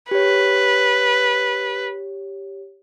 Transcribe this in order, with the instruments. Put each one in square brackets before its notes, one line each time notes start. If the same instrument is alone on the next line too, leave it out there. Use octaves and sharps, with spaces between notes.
[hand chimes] G4 C#5 [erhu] B4